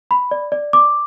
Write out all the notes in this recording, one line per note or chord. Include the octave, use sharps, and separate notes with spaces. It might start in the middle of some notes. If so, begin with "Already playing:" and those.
B5
D5
D5
D6